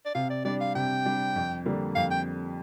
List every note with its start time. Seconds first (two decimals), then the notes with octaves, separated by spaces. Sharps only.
0.06 D5
0.15 C3 F5
0.30 D5
0.45 G3 D4 D5
0.61 F5
0.75 C3 G5
1.05 G3 D4
1.36 F2
1.65 D3 G3 A#3
1.95 F2 F5
2.11 G5